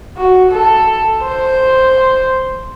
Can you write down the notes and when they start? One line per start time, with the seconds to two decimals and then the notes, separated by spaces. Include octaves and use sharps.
0.17 F#4
0.51 A4
1.23 C5